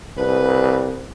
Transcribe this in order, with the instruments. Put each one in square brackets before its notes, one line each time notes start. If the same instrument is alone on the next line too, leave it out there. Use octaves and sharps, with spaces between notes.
[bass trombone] C2 [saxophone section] B4